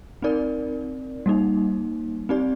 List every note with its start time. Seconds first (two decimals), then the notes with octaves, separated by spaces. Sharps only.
0.22 C4 D#4 A#4 D5
1.26 G3 A#3 D#4
2.29 C4 D#4 G4 D5